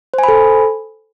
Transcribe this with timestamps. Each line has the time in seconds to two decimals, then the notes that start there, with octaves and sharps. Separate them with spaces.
0.14 C5
0.19 G#5
0.23 B5
0.28 A4